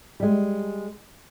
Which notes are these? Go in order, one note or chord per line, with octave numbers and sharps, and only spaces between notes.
G3 G#3